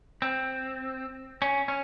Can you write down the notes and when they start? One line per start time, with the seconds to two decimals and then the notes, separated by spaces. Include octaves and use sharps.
0.22 C4
1.42 C#4
1.68 C#4